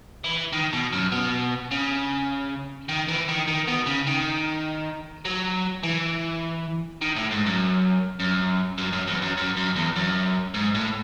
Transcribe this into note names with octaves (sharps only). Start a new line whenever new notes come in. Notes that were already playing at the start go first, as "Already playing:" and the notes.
E3
D#3
B2
F#2
B2
C#3
D#3
E3
D#3
D#3
B2
C#3
D#3
F#3
E3
D#3
A2
G#2
F#2
F#2
F#2
F#2
E2
F#2
F#2
F#2
E2
F#2
G#2
A2